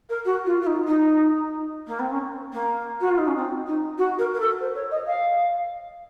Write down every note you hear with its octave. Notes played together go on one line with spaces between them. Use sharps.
A#4
F#4
F4
F4
D#4
D#4
A#3
C4
C#4
A#3
F#4
F4
D#4
C#4
C4
D#4
F#4
A#4
A#4
A4
C5
C#5
D#5
F5